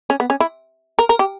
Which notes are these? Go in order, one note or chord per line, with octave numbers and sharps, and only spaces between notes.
C#4
B3
C#4
E4
A#4
A#4
G4